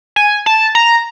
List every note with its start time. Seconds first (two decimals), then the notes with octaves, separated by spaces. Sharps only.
0.16 G#5
0.46 A5
0.75 A#5